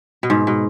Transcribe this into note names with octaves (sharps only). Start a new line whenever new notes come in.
B2
G#2
B2